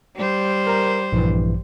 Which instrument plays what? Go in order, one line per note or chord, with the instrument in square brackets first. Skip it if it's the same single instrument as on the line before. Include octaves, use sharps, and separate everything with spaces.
[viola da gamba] G3 C5
[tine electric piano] A#4 A#5
A#1 G2 E3